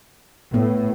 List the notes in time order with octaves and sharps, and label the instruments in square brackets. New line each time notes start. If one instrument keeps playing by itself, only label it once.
[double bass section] A2 [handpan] B3